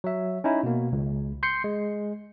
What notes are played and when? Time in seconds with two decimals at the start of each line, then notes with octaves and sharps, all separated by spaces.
0.04 F#3 E5
0.44 C#4 D#4 E4
0.63 B2 A#3
0.92 C#2
1.43 C6 G6 C7 C#7
1.64 G#3